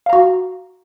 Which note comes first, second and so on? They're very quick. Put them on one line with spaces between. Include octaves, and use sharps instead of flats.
F5 A#5 F#4